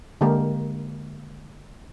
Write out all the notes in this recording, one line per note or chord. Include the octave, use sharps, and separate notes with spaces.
D3 G#3 A#3 G4 A#4